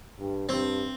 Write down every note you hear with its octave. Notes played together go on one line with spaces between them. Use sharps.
G2
G2 C4